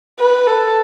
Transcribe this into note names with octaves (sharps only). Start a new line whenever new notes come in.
B4
A4